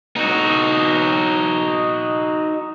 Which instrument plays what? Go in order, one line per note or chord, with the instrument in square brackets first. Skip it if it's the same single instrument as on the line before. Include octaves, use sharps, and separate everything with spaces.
[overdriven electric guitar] D#4 F#4